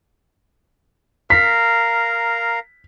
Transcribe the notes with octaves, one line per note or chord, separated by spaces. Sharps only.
A#4 F5 A#5 B6